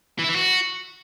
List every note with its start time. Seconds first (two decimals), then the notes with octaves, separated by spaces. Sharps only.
0.19 E3
0.24 E4
0.29 E3
0.34 F#4